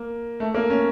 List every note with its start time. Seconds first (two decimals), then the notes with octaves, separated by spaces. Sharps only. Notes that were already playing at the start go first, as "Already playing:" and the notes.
Already playing: A#3
0.40 A3
0.54 A#3
0.70 C#4